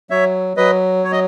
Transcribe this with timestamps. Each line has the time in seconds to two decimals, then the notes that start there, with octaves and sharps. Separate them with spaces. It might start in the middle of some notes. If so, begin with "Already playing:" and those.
0.10 F#3 C#5 E5
0.57 F#3 B4 D#5
1.04 C#5
1.12 D#5